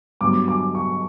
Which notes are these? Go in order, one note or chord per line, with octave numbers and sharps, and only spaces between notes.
G2 F#3 B3 D6
D6
C#6